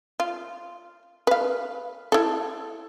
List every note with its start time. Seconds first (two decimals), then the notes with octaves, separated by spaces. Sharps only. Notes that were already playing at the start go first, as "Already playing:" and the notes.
0.20 F4
1.27 B4 F5
2.12 E4 A4